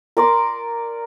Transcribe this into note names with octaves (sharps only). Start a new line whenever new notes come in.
A#4 D5 C6 D6